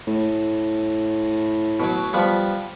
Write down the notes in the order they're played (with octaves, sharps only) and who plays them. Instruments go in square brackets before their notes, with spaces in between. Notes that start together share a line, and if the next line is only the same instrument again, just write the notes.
[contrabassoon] A2
[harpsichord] B2 F#3
F3 G3 B3